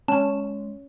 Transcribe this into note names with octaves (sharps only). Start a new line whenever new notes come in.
G#3 C#4 A5